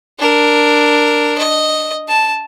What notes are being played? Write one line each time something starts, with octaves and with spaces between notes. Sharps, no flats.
D4 A#4
D#5
A5